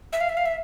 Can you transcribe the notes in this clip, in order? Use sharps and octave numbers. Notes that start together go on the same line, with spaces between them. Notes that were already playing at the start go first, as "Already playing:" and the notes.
E5
F5
E5
F5
E5